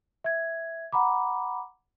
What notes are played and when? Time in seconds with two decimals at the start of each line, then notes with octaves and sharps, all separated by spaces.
0.24 E5 G#6
0.92 F#5 A#5 B5 D6